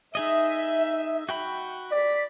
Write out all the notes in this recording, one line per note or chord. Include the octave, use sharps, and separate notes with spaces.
D#4 G#4 D#5 E5
F#4 G5 B5
D5 B6